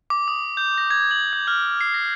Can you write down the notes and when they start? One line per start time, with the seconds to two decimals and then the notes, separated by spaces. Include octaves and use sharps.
0.10 D6
0.28 D#6
0.57 G6
0.78 A#6
0.91 G#6
1.11 F#7
1.33 G6
1.47 F6
1.81 C7
1.94 A#6